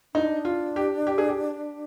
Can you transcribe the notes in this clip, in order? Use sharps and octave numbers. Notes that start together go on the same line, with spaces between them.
D4 D#4
F4
G4
G4
G#4
G4